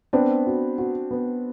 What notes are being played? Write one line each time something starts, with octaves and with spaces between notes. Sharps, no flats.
B3 C4 D4
F#4
F#4
B3